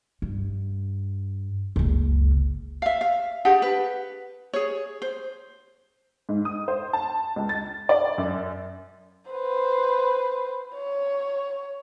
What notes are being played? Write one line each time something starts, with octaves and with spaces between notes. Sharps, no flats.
G2
F#1 C#2
E5 F5
F5
D4 G4 G#4 F#5
B4
G#4 C#5
C5
G#2
D#6
C5
A5
C#2
A6
D5
F#2
B4 C5
C#5